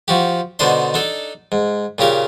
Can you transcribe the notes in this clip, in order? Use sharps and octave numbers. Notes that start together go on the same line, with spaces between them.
F3 F#4 G4
B2 D3 D4 D#4 C5 C6
D4 D#4 A4
G#2
A#2 C#3 G4 A#4